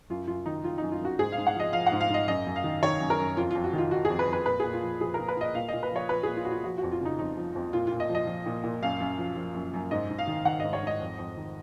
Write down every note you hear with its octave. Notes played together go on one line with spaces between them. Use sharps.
F#2 F4
F#2 F4
D#3 D#4
D#3 F4
F#2 D#4
F4
F#2 F#4
G#2 G#4
G#2 F5
F#5
F3 D#5
F3 F5
F#5
G#2
F5
G#2 D#5
F#2 D#5
F#2
F5
D#3
D#3 C#5
F#2
A#4
F#2
F2 F4
F2 F4
F#4
D#3 F4
D#3 F#4
F2 G#4
B4
F2
B4
A#2 B4
A#2 G#4
F4
F3
F3 G#4
A#2 A#4
B4
A#2 D#5
A#2 F5
A#2 D#5
B4
F3 C#5
F3 B4
A#2 G#4
F4
A#2 F#4
F4
F3 F#4
F2 F#4
F4
C#3 D#4
F2 D#4
F3
F2
A#2 F4
A#2 F4
D#5
F3
D#5
F3
A#2
A#2
F#2 F5
F#2
F3
F3
F#2
F#2
G#2 D#5
G#2
F5
D#3
D#3 F#5
G#2 D#5
C#5
G#2 D#5
F2
F2
D#3